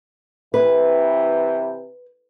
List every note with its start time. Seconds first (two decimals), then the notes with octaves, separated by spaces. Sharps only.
0.54 C3 E3 E4 B4